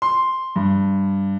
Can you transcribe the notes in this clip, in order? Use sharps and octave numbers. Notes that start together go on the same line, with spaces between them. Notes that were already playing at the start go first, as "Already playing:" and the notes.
C6
G2